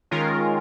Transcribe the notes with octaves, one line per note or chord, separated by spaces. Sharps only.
D#3 G#3 C#4 F4 A#4